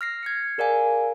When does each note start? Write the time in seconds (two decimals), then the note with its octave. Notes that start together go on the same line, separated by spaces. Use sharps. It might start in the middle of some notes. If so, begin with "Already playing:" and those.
0.01 F6 A#6 C7
0.23 G#6 C7 C#7
0.58 G#4 A#4 D5 F5 G#5